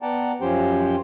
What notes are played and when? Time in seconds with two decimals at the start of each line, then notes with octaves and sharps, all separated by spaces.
0.02 B3 D5 F#5 G5 A5 A#5
0.41 F#2 F3 C#4 G4 C5 G5